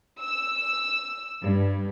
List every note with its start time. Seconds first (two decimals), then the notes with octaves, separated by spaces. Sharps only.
0.20 E6
1.43 G2